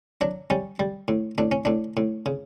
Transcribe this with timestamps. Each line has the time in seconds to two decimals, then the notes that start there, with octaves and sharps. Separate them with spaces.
0.21 F#3 D4
0.50 G3 C#4
0.79 G3
1.08 A2
1.38 A2 D4
1.52 C#4
1.65 A2 D4
1.97 A2
2.26 C#3